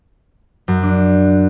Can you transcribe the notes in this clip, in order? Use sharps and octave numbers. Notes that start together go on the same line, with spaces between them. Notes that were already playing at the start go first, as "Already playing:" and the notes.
F#2
D4